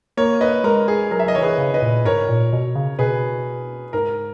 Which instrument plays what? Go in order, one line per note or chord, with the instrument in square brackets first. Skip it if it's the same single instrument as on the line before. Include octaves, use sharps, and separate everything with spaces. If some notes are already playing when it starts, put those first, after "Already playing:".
[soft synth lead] A#3 [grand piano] A#4 C#5
[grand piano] B4 D#5
[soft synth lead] G#3 [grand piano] A#4
[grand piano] G#4
[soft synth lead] F#3 [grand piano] A#4
[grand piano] E5
D#5
[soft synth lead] E3 [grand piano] C#5
[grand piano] G#4 B4
[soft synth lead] C#3
[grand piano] B4 D#5
[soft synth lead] A#2
[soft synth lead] G#2 [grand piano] A#4 C#5
[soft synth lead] A#2
B2
C#3
[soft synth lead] B2 [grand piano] G#4 B4
[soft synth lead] G#2 [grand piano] A#4